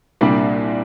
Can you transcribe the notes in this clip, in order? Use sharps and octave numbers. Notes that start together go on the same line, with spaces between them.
C2 A#2 G3 D4